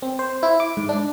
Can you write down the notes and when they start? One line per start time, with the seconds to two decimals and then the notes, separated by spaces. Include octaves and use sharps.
0.02 C4
0.19 C5
0.43 E4
0.60 D6
0.77 G#2
0.89 D4